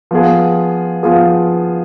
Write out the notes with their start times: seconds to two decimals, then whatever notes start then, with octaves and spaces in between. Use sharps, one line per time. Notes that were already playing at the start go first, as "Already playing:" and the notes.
0.11 F3 B3 F4 G#4
1.03 F3 B3 F4 G#4